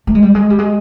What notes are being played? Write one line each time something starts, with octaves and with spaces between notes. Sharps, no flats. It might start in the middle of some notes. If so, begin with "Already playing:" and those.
A3
G#3
G3
G#3
G3
G#3